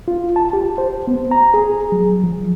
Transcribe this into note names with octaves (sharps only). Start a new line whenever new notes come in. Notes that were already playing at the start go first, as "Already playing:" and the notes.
F4
A5
G4
C5
B3
A#5
G#4
F#3
F3